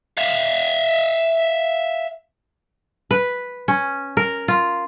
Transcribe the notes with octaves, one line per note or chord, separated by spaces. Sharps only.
E5 F5
B4
C#4
A#4
F4